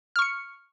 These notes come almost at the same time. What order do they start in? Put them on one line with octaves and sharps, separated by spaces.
F6 C#6 C#7